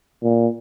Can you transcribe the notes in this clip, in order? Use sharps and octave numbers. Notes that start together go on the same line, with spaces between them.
A#2